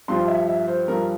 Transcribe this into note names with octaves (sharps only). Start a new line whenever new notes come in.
G2 F3 C6
E5
E5
C5
G2 F3 A#4